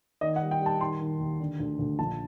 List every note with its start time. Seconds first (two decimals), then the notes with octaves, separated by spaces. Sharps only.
0.21 D#3 D#5
0.36 F#5
0.42 G3
0.51 G5
0.61 G3
0.66 A5
0.81 D#3 C6
1.00 D#3
1.20 D#2
1.40 D3
1.60 D2
1.79 D2
1.99 A#1 A5